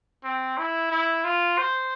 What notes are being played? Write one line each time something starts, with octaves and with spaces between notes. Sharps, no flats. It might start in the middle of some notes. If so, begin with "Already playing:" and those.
C4
E4
E4
F4
C5